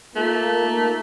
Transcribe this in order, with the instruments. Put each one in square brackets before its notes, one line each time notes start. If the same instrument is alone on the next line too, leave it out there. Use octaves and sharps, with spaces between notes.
[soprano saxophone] A3 [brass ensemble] A#3 D#4 F4